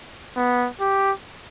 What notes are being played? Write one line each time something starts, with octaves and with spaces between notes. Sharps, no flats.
B3
G4